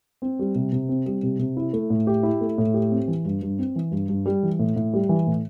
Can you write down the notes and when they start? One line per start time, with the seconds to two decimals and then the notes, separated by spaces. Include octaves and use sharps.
0.22 C4
0.39 G3
0.55 C3
0.72 C3
0.89 C4
1.06 G3
1.23 C3
1.39 C3
1.57 E4
1.73 A3
1.90 A2
2.07 G4
2.23 E4
2.41 A3
2.58 A2
2.74 G4
2.91 C4
3.08 E3
3.25 G2
3.42 G2
3.59 C4
3.76 E3
3.91 G2
4.09 G2
4.26 G3
4.43 E3
4.59 A2
4.76 A2
4.94 G3
5.09 E3
5.27 A2